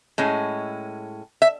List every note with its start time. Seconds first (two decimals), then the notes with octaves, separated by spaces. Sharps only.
0.18 A2 G#3 C#4
1.42 E5